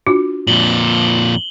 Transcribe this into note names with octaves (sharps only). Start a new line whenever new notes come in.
D4 F4 F#4
F2 A#2 F#7 G7